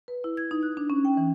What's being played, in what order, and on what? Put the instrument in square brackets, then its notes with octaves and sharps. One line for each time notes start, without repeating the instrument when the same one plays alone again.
[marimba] B4
E4
G#6
D#4
F#6
D4
C#4
G5
E3